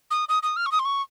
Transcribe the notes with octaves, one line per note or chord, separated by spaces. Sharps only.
D#6
D#6
D#6
F6
C#6
D#6
C6
C#6